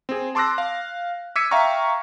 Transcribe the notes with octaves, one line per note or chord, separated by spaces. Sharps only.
C4 G#4
A5 C6 D6 E6 F#6 A#6
F5
D6 E6 G#6 B6 C#7 D#7
E5 F5 G5 A#5 C#6 F6